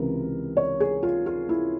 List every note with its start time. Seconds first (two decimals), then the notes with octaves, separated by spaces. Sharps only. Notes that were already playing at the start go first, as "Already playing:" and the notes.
Already playing: C#2 C3 E3 A#4
0.57 C#5
0.80 G#4
1.03 F4
1.26 F4
1.49 E4